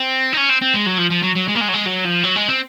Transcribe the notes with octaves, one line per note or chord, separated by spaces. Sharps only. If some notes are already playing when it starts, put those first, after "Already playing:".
Already playing: C4
D#4
C#4
C4
C4
G#3
F#3
F3
F3
F#3
F#3
G#3
A#3
G#3
F#3
G#3
F#3
F3
F#3
G#3
C4